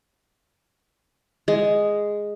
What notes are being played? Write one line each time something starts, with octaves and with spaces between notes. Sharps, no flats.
G#3